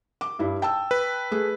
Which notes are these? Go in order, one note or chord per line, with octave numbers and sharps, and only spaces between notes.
D6
G2 E4
G5 A5 E6
B4
A3 G#4